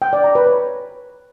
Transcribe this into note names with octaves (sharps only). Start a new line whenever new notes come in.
G5
D5
A#5
B4
C#5